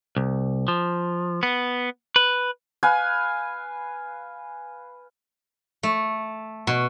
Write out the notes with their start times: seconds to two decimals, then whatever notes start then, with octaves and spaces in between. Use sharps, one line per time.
0.17 C2
0.68 F3
1.43 B3
2.16 B4
2.83 B4 F5 G#5
5.83 A3
6.67 B2